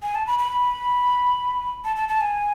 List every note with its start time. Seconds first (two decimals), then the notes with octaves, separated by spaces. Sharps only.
0.02 G#5
0.15 A5
0.27 B5
0.39 B5
1.84 A5
1.96 A5
2.09 A5
2.21 G#5